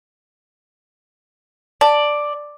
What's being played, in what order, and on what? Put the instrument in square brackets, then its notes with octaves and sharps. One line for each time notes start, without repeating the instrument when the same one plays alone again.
[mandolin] D5 [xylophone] A5